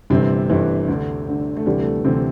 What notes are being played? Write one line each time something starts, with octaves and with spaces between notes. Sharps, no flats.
G1 G2 C3 E3 C4
G1 G2 E3
D2 D3
D2 D3
A3
D2 C3 E3 G3
A3
D2 C3 E3 C4